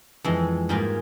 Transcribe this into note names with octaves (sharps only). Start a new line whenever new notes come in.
F2 E3 G#3
G#2 G3 A#3 F4 G#4